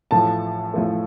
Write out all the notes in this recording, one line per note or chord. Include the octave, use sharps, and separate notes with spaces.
A1 A2 F3 A3 A5
A1 A2 F3 A3